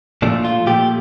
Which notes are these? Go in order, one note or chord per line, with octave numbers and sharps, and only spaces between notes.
A#2 F3 A3 D4
F4
A#2 F3 A3 G4